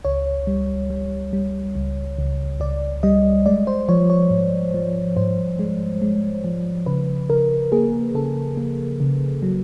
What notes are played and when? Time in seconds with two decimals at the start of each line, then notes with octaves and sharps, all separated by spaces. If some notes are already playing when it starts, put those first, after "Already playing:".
0.05 C#2 C#5
0.47 G3
0.90 G3
1.33 G3
1.75 C#2
2.18 C#2
2.60 C#2 D5
3.03 G3 D#5
3.46 G#3 D5
3.67 C5
3.89 F3 C#5
4.10 C#5
4.30 G#2
4.74 F3
5.16 G#2 C5
5.59 G#3
6.02 G#3
6.44 F3
6.86 C#3 B4
7.29 C#3 A#4
7.72 A#3 G#4
8.15 C#3 A4
8.57 A#3
9.00 C#3
9.43 F#3